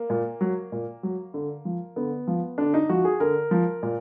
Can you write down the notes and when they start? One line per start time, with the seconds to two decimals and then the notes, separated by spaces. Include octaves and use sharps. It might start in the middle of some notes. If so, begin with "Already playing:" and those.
Already playing: A#3
0.10 A#2
0.41 F#3
0.72 A#2
1.03 F#3
1.34 D3
1.65 F3
1.96 D3 B3
2.27 F3
2.58 D3 D4
2.74 D#4
2.89 F3 F#4
3.05 G#4
3.20 D3 A#4
3.51 F3
3.83 A#2